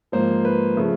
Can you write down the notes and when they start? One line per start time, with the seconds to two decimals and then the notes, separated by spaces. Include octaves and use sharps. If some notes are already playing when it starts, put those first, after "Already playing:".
0.12 G#2 F3 A#3 C5
0.45 B4
0.77 C#3 F3 A3